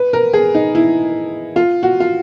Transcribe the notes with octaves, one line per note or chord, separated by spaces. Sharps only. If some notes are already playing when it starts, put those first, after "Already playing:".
Already playing: B4
A#4
G#4
D#4
E4
F4
F#4
F4